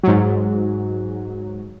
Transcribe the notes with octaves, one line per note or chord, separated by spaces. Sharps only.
G#2 F#3